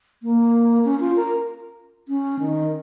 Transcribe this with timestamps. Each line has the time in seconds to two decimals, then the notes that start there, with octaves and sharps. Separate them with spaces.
0.23 A#3
0.85 C#4
1.00 F4
1.16 A#4
2.08 C#4
2.40 D#3